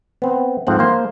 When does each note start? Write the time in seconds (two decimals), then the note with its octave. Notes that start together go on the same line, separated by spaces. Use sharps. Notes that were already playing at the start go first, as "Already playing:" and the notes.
0.22 B3 C4
0.67 G#2 F3 A3 C4 F#5
0.79 A#3 C5